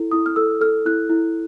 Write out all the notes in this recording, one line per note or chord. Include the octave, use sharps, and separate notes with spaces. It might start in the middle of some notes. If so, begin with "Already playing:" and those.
Already playing: E4 A4
E4 D#6
F6
A4 E6
A4 F6
E4 F#6
E4